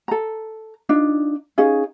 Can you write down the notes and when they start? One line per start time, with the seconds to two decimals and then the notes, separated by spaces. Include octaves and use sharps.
0.08 A4 A#5
0.89 D4 D#4 F4
1.58 C#4 D#4 G#4 F5